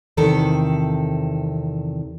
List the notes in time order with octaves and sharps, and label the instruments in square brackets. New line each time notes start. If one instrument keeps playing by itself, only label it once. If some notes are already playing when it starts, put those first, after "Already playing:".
[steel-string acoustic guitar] E2 C3 D#3 A4